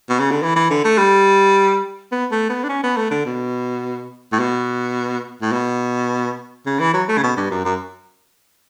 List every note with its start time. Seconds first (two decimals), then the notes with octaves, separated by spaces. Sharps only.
0.09 B2
0.20 C#3
0.31 D3
0.42 E3
0.56 E3
0.70 D3
0.85 A3
0.98 G3
2.12 B3
2.31 A3
2.49 B3
2.64 D4
2.69 C#4
2.83 B3
2.97 A3
3.11 D3
3.25 B2
4.32 A2
4.39 B2
5.41 A2
5.52 B2
6.66 C#3
6.79 E3
6.93 F#3
7.09 A3
7.18 C#3
7.23 B2
7.37 G2
7.51 F#2
7.65 F#2